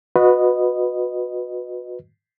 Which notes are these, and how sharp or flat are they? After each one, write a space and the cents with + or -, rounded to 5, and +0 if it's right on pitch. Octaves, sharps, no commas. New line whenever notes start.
F#4 -30 B4 +0 D#5 -10